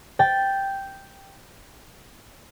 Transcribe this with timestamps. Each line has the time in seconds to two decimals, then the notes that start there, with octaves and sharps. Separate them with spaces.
0.19 G5 A6